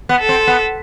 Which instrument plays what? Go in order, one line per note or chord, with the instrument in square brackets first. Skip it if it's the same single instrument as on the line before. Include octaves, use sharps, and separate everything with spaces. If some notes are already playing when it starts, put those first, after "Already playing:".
[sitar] B3
[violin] A4
[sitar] C4
B3